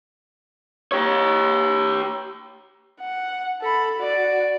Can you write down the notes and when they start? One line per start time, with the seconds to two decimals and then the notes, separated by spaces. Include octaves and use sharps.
0.92 G4 C#5
3.01 F#5
3.61 A4 B5
3.99 F#4 D5